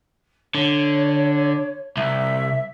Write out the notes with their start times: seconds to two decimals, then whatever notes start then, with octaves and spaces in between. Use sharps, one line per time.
0.55 D3 C#5
1.97 C2 E5